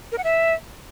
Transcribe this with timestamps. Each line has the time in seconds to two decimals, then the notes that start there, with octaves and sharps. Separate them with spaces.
0.12 A#4
0.18 F#5
0.24 E5